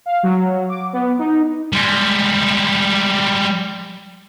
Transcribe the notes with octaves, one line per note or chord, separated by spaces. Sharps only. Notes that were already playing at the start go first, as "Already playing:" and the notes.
F5
F#3
D6
B3
D#4
G3 G#3